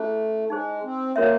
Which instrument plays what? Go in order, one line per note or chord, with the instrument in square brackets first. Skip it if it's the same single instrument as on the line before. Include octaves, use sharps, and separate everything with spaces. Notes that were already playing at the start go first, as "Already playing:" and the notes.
Already playing: [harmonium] A3 [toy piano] C#4 E4 G#4 C5
[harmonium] G#3 [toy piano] D#4 G#4 C5
[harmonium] C4
[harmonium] A#3 [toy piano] C#4 F#4 A#4 C#5 E5